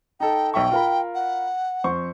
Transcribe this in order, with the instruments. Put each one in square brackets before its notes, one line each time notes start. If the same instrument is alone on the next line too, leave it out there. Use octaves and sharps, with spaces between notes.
[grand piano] D#4 A4 [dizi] G5
[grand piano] B1 E5 C#6 [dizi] G5
[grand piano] F4 A#4 B5
[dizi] F#5
[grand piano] F2 C5 C#6